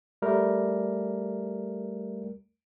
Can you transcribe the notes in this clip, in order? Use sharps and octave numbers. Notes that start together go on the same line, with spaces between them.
G3 A3 A#4